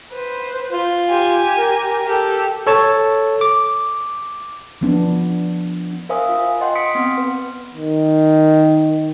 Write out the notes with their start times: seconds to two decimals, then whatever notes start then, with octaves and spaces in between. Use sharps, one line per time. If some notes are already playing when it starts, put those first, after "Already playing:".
0.11 B4 C5
0.72 F4
1.10 G4 G#5
1.58 A#4
2.06 G4 A4
2.67 A4 C#5 A5
3.41 D6
4.81 F3 B3 D4
6.09 A#4 C5 E5 F5 G#5 D#6
6.29 F4
6.61 D#5 F#5 G5 C6
6.75 C6 D#6 B6 C#7 D7
6.95 B3 C4
7.18 B4
7.74 D#3